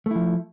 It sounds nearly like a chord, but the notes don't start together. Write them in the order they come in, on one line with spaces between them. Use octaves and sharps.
A3 E4 F3